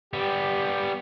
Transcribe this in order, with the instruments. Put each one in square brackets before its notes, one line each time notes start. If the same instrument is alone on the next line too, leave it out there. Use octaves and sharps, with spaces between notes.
[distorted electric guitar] G3 B3 [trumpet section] G4